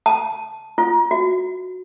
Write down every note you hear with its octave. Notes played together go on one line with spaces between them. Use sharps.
A5
F4
F#4